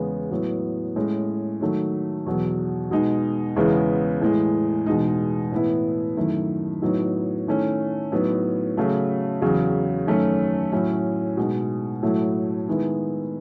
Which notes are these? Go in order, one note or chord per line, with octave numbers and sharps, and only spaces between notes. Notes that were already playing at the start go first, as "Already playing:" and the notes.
Already playing: E2 C#3 G#3 B3
A2 F#3 B3 E4
A2 G#3 C#4
D#3 F#3 A3
E2 B2 F#3
B2 G#3 D#4
E2 C#3 G#3 B3 E4
A2 E3 G#3
E2 B2 G#3 D#4
A2 E3 B3 E4
F#2 D#3 A3 E4
A2 F#3 B3 D#4
D#3 A3 C#4 E4
A2 F#3 B3 D#4
C#3 F#3 A3
E2 C#3 F#3
F#2 D#3 A3 C#4
A2 F#3 C#4 E4
B2 G#3 D#4
A2 F#3 A3 E4
D#3 G#3 B3 E4